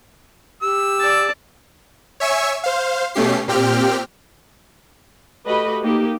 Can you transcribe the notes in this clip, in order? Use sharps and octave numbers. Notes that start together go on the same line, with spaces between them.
G4 E6
D5 A5
C#5 E5 G#5 C#6 E6
C5 F5
B2 A3 C#4 G4 C7
A#2 C4 G4 G5 F6
A3 F#4 G4 B4 D#5 B5
A#3 D#4 G4